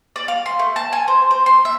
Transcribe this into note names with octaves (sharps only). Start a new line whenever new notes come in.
D5
F5
C6
A3
A5
G#5
C5
C5
C6
E5